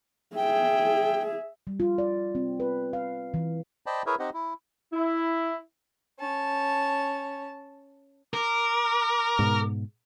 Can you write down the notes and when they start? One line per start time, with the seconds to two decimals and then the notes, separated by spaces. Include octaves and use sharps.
0.36 G#4 E5 G5
1.67 G3
1.80 F4
1.98 D5
2.35 C4
2.60 B4
2.93 F5
3.34 E3
3.86 C5 D5 D#5 G5 A5 B5
4.06 E4 G#4 A#4 B4 C#5 E5
4.19 C4 D#4 G4 C5 D#5 F#5
4.34 E4
4.92 E4
6.19 C#4 A5
8.34 A#4 D6
9.39 G#2 B2